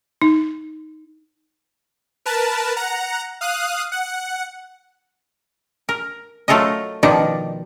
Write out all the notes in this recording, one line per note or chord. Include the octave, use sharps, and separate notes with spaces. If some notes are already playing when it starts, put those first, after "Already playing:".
D#4
A#4 B4 A5
F#5 A#5
F5 D#6 F#6
F#5
A#4
F#3 A3 F4 A4 A#4 D#5
B2 D#3 F3 D#4 D5